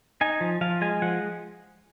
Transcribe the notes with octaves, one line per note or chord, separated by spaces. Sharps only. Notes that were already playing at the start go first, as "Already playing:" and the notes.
D#4 G#5
F3
F3 F5
G#3 G#5
F3 F#5